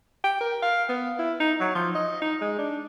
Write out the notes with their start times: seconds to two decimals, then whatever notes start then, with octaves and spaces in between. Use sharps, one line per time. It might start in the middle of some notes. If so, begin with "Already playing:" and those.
0.24 G5
0.41 A#4
0.63 F5
0.89 B3
1.19 E4
1.40 D#4
1.61 F#3
1.75 F3
1.95 D#5
2.22 D#4
2.41 G#3
2.59 D4